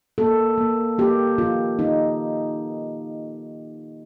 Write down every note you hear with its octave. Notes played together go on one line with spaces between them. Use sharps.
A#3 A4
A#3
A#3 G4
D#3 F4
D#3 D#4